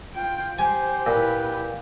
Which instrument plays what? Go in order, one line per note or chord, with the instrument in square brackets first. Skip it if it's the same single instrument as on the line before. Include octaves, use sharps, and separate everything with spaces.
[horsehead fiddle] F4 G5
[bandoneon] G4 [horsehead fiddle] C5 [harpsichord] G#5
[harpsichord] A#2 [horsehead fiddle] E4 B4